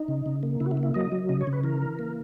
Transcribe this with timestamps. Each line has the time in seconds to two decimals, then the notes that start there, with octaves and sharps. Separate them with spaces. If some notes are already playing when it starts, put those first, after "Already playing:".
Already playing: D#4
0.08 C#3
0.26 C#3
0.43 A#3
0.60 C#3 E4
0.66 F#4
0.71 E4
0.77 A#3
0.83 E4
0.94 F#3 D#5
1.12 F#3
1.29 C#3 D#5
1.41 C#5
1.47 C#3
1.53 B4
1.64 E3 A#4
1.82 E3
1.99 A#3